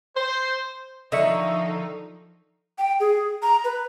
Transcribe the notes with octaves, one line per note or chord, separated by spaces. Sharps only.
C5
D3 D#3 F3 D#4 D#5 E5 C#6
G5
G#4
A#5
B4